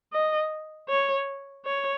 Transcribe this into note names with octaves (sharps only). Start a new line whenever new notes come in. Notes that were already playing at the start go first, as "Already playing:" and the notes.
D#5
C#5
C#5